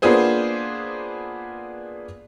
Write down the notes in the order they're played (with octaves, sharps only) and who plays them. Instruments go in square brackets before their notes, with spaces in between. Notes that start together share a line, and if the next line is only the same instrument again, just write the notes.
[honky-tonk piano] A#3 B3 D4 F4 G#4 C5